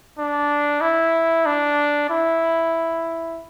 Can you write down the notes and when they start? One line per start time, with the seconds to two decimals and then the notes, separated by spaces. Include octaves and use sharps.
0.18 D4
0.81 E4
1.46 D4
2.10 E4